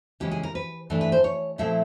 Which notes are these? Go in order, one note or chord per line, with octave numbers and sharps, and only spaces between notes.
C#3 E3 G#3 C#4 G4
G#4
A#4
B4
G2 E3 A3 D4
B4
C5
C#5
A#2 F3 A3 C4 E4 E5